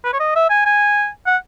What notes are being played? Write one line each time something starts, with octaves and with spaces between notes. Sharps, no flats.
B4
C#5
D#5
E5
G#5
G#5
F#5